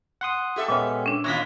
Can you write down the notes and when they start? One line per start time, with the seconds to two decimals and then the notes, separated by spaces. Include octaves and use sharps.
0.21 F#5 C6 D#6
0.56 G4 A4 E5
0.68 A#2 G#3 B3 C#4
1.06 C#4 D4
1.24 A#2 D#3 F4 C#5 A#6 B6